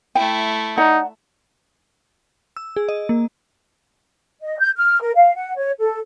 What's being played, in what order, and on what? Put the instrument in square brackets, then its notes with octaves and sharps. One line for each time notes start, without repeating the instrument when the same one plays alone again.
[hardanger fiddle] A3 E4 [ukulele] G5
[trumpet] D#4 [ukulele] D5 F#5 A#5
[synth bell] E6
G#4
D#5
A#3
[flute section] D#5
G6
F6
A#4
F5
F#5
C#5
A4